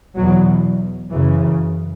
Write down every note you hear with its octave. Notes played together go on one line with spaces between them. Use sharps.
E2 B2 F#3
F#2 C#3 E3